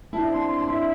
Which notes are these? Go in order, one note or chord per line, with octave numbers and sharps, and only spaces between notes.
E4 A5
D4
C4
D4 C6
C6
D4
E4 E5